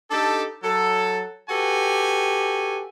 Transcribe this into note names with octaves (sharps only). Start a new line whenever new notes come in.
D4 D#4 G4 A4
F#3 A4
F#4 G4 A4 B4 G#5